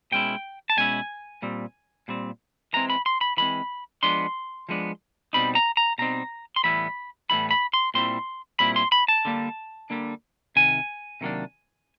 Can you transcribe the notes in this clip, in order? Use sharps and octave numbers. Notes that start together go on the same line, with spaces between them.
B2 G#3 C#4 E4 G5
A5
B2 G#3 C#4 E4 G#5
A#2 G3 C4
A#2 G3 C4
E3 G#3 C4 A#5
B5
C6
B5
E3 G#3 C4 B5
F3 G#3 B3 D4 C6
F3 G#3 B3 D4
B2 G3 C4 D#4 B5
A#5
A#5
B2 G3 C4 D#4 A#5
C6
A2 E3 G3 B3 E4 B5
A2 E3 G3 B3 E4 B5
B5
C6
A#2 G3 C4 E4 C6
A#2 G3 C4 E4 B5
C6
B5
A5
D3 G3 A#3 D4
D3 G3 A#3 D4
C3 D#3 G#5
C3 D#3 F#3 A#3 D4